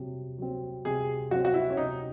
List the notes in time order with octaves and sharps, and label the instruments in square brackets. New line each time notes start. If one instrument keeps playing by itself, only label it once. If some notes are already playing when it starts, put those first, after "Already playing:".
Already playing: [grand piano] C3 F#3
F#3 C4
[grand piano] C3 [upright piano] G#4
[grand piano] F#3 C4 [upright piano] F#4
[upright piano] F#4
E4
C#4
[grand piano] C3 [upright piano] D#4